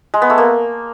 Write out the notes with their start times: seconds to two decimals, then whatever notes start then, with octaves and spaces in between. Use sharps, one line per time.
0.14 G#3
0.22 B3
0.30 A3
0.38 A#3